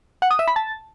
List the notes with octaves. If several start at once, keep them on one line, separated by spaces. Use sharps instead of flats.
F#5
D#6
E5
B5
A5